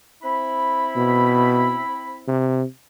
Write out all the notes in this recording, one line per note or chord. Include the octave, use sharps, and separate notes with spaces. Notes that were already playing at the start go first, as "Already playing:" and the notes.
C4 E4 B5
B2
C3